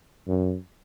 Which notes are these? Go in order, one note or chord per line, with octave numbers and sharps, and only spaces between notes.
F#2